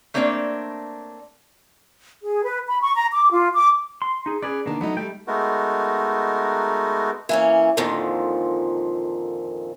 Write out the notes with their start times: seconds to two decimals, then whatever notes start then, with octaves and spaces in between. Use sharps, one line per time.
0.14 A3 A#3 C4 D4 C#5 D5
2.23 G#4
2.42 B4
2.67 B5
2.82 C#6
2.95 A#5
3.12 D6
3.30 F4
3.53 D6
4.02 C6
4.26 D#4 G#4
4.42 C#4 G#4 B4 D5
4.66 D3 D#3 A#3 B3 D4
4.81 F#3 A3 B3 D#4
4.97 G3 A3 G5
5.27 G#3 A3 B3 D#4 F#4 A#4
7.29 E3 A#3 C#4
7.77 F2 A#2 D3 D#3 F3